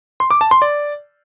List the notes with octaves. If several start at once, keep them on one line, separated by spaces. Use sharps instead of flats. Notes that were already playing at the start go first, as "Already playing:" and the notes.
C6
D6
A5
C6
D5